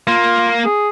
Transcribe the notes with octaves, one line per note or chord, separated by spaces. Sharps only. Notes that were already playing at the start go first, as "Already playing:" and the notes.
A#3 F4
G#4